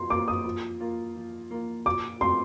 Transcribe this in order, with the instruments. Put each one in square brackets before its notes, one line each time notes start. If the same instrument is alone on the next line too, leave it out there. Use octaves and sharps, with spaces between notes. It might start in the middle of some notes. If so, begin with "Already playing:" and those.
Already playing: [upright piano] F3 A#3 [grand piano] C6
[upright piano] A#3 F4 [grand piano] D6
[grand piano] D#6
[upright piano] F3
A#3 F4
F3
A#3 F4
[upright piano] A#2 [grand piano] D6
[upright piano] A3 C4 [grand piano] C6